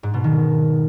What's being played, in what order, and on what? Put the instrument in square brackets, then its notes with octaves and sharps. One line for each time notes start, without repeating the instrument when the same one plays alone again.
[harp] G#2
B2
D#3